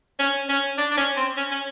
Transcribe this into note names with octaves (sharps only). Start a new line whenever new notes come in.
C#4
C#4
D4
D4
C#4
C4
C#4
C#4